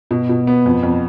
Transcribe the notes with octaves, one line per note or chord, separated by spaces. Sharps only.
B2
B2
B3
F2
F2